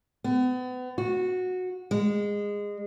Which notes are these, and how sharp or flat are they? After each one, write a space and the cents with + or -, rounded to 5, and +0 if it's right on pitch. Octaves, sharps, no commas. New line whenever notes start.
B3 +35
F#4 -15
G#3 -20